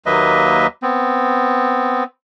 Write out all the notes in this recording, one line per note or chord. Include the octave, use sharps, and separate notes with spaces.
D#2 F#3 A#3 B4 D#5 E5
B3 C4